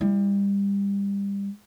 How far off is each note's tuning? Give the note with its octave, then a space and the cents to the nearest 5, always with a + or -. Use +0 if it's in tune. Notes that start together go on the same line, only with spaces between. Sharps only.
G3 +30 E4 +0